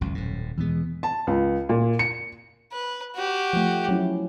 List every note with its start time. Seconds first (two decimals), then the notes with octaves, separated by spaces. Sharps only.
0.01 G#1 C#2 F#2
0.15 D#1 A2
0.58 E2 B2 E3 G#3 B3
1.03 A5
1.27 C#2
1.69 A#2
1.99 C#7
2.72 B4
3.15 F#4 G4
3.53 F3 A3
3.89 F#3 C#4 E4